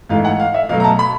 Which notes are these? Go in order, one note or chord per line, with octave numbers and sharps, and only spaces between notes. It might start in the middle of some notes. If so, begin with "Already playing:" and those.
G#2 E3 A3 F5
F#5
F5
E5
B2 F#3 A3 F5
A#5
A5
B5